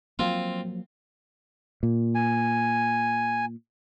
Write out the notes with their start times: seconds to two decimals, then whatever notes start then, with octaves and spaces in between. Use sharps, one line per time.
0.19 F3 F#3 A#3 C4 F4
1.83 A#2
2.15 G#5